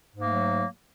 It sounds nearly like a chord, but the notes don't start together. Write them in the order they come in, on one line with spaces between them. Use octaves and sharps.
G#2 A#3 A3 F#3